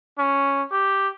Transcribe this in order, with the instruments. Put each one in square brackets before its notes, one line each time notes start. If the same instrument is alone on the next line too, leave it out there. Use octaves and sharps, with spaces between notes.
[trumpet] C#4
G4